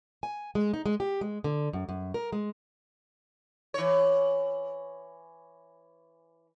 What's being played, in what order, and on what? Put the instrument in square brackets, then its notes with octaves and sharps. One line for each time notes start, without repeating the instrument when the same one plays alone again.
[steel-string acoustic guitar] G#5
G#3
D#4
G#3
G4
G#3
D3
F#2
F#2
A#4
G#3
[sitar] E3 C#5